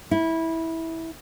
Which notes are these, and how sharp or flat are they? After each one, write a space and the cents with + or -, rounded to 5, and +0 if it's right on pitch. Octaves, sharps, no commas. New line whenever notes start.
E4 -15